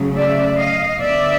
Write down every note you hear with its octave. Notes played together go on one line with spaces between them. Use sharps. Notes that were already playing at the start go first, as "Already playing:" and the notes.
Already playing: C#3 F#3 A3
D5 E5
D#5 F5
D3 F#3 B3 D5 E5